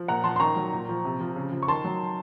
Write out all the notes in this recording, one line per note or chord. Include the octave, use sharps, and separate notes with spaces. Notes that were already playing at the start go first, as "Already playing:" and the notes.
Already playing: F3
A#2 F#5 A#5
F3 A5 C6
C6
D#3 A#5 C#6
F#3
A#2
F3
C3
F3
C#3
F3
C#6
D#3 A5 C6
F#3